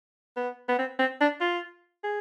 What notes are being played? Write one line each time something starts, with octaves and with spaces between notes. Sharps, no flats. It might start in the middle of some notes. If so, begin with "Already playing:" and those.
B3
B3
C4
C4
D4
F4
G#4